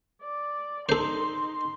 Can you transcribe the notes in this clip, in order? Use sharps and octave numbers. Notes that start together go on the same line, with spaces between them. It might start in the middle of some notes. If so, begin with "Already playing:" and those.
D5
D#4 A4 C5 C6